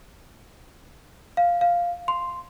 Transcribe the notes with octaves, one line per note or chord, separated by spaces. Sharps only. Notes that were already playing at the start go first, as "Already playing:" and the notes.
F5
F5
C6